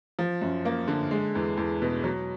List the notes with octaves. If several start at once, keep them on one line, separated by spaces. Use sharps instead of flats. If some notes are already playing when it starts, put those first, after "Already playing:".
F3
F#2
A#3
D3
G#3
E2
E2
B2
F#3